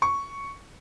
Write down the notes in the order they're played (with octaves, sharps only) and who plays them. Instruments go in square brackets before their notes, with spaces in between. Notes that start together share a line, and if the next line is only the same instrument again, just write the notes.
[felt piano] C#6